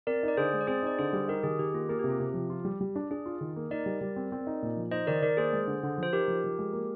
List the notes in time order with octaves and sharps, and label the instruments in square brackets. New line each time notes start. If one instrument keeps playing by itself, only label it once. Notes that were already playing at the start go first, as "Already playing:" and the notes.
[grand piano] C4 [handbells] A#4 D5
[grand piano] D#4
[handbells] D5
[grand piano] D3 [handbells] G#4 C5
[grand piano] G#3
[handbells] D5
[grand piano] C4 [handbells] G#4 C5
[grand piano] D#4 [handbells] D5
[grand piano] D3 [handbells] G#4 C5
[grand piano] G3
[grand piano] D#4 [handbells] G4 A#4
[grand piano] D#3 [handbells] G#4
[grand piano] D#3 [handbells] G4
[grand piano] A#3 [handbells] F4
[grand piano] A#3 [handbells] G#4
[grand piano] C3 [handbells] G4
[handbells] F4
[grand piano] C3 [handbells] G4
[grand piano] F3
F4
G3
G3
D4
[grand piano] D4 [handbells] G#4
[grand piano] F4
D#3
A#3
[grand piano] D#4 [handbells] A#4 D5
[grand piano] G3
G3
C4
C4
D#4
A#2
F3
[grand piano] D#4 [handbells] C5 D#5
[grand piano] D#3 [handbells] A#4 D5
[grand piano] D#3 [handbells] A#4 D5
[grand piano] A#3 [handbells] G#4 C5
[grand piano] G#3
D3
D3
[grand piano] F3 [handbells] C5
[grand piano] D#4 [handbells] G4 A#4
[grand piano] F3
F3
G#3
A#3